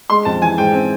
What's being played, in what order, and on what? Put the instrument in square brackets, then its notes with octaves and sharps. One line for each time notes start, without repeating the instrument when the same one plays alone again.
[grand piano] G#3 [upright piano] C6
[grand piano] F2 [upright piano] A5
[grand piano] E3 [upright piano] G#5
[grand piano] G#2 [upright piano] G5
[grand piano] C4